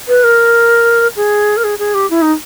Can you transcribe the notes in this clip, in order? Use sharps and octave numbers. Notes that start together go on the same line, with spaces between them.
B4
A#4
G#4
A#4
G#4
G#4
G4
E4
D#4